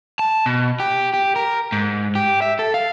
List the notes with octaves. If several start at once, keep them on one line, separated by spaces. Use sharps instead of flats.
A5
B2
G4
G4
A#4
G#2
G4
E5
A4
F5